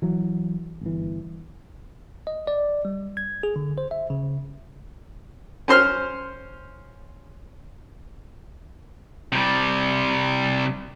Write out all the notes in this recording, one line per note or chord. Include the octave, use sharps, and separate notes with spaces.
E3 F#3
G1 E3
D#5
D5
G3
G#6
G#4
D3
C5
E5
C#3
C#4 C5 C6 F6
C3 G3